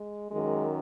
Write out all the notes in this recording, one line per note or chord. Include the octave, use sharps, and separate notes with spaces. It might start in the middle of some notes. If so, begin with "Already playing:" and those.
Already playing: G#3
F#2 D#3 G#3